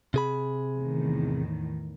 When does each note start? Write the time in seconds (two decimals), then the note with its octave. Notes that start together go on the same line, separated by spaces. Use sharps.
0.14 C3 G#4 B5
0.77 E2 A2 D#3